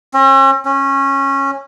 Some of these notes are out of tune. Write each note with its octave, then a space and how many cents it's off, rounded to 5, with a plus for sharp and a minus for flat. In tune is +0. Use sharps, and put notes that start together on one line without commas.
C#4 -45
C#4 -20